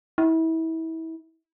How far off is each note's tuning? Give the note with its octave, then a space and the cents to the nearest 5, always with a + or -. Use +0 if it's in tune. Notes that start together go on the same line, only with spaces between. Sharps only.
E4 -30